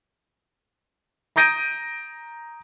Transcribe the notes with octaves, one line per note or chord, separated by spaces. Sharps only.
A#5 D#6 G6 A#6 D7 D#7